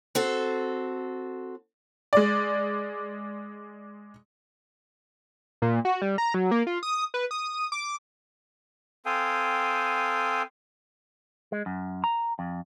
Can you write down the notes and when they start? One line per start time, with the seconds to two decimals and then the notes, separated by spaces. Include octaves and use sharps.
0.15 C4 F#4 A4
2.13 G#3 D5
5.62 A#2
5.85 F#4
6.02 G3
6.18 A#5
6.34 F#3
6.51 A#3
6.67 F4
6.83 D#6
7.14 B4
7.31 D#6
7.72 D6
9.06 C4 A4 F5 G5 G#5 D#6
11.52 G#3
11.66 F#2
12.04 A#5
12.39 F2